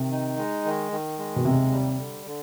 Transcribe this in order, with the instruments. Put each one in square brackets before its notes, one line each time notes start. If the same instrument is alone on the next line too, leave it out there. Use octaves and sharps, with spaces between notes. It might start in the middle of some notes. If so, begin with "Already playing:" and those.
Already playing: [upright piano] C3 [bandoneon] D#3
[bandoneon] D#4
G#3
D#3
D#3
G#3
[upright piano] B2
[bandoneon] D#2 [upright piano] C3
[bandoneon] G3
D3
D3